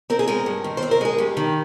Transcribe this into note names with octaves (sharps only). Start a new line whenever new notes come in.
C4 A#4
G#4
G#3 A#4
G2
D#3
C5
C4
A#4
G#3 G#4
G2 G4
D#3